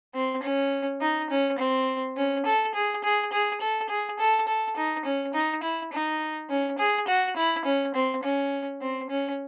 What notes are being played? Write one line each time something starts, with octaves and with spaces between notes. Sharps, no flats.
C4
C#4
D#4
C#4
C4
C#4
A4
G#4
G#4
G#4
A4
G#4
A4
A4
D#4
C#4
D#4
E4
D#4
C#4
G#4
F#4
E4
C#4
C4
C#4
C4
C#4